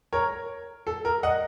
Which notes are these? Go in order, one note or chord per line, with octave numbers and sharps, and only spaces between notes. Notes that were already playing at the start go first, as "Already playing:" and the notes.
A#4 C#5
A4
A#4
D#5 F#5